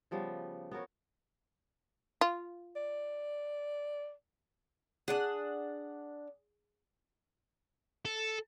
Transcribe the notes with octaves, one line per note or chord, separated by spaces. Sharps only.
C#3 F3 G3 B3
B3 F#4 A#4 C#5
F4
D5
D4 G#4 D5 F#5
A4